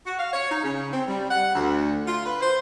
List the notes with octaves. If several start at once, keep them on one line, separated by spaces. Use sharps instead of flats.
F#4
F5
C#5
D#4
C#3
C4
G3
F#5
D2
F4
B4
C5